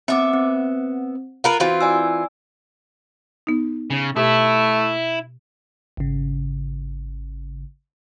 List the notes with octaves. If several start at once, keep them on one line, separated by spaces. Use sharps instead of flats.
B3 C4 E5 D6
C4
F4 A#4 B4
E3 C4 F4 F#4
D5 G#5 E6
B3 D#4
C#3
B2 A3 E4 G4 A5
G#1 C#3